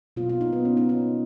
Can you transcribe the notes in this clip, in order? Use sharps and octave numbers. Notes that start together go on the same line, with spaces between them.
B2 F#3 A#3 F4
F4
D#4
B3
C#4
D#4
D#4